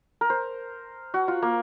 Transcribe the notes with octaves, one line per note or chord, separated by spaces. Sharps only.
A#4
C5
F#4
F4
A#3